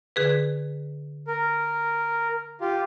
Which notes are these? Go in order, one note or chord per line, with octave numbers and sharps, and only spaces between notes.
D3 G#4 B4
A#4
F4 G4